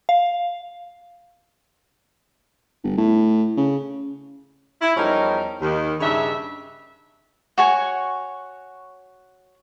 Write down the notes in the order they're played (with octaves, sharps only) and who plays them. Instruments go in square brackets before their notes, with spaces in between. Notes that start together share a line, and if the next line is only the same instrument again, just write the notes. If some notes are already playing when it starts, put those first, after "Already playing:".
[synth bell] F5
[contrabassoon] G1
A2
C#3
[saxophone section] E4
E2 F3 G3 C#4 D#4 A#4
D#2 D#3
G2 C#3 D4 D#4 E5
[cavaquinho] F#4 C#5 G#5 C#6